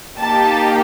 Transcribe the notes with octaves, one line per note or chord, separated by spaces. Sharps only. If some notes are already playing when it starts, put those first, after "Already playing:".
A#3 D#4 G4 A5